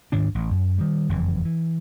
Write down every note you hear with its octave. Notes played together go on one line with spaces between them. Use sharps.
D2 G#2 D#3 D4
A1
F#2
D#3 G3
F#1 F2 E3
E3